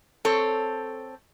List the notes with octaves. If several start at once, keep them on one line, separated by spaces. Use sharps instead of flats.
C4 A4 C#5